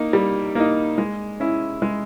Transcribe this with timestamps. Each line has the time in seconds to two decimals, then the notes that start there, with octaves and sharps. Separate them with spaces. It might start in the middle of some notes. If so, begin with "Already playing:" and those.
Already playing: A#3 D#4
0.13 G3
0.55 A#3 D#4
0.98 G#3
1.40 C#4 E4
1.82 G#3